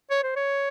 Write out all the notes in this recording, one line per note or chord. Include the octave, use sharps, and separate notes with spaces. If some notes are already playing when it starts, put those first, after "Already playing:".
C#5
C5
C#5